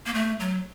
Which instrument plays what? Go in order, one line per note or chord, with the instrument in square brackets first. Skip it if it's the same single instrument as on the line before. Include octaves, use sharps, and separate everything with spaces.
[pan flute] A#3
A3
F#3